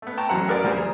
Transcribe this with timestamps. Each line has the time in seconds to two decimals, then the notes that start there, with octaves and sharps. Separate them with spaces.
0.02 A3 B3
0.17 G5 A5 A#5 C#6
0.29 A1 F#2 F#4 C5 F#5 A#5
0.48 F#4 G#4 A#4 B4 D5 F#5
0.64 D2 F3 G3 C5 G#5 F6
0.77 G#4 A#5